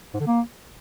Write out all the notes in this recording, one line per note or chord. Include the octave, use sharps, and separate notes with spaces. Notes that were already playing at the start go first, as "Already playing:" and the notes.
G#2
D3
A#3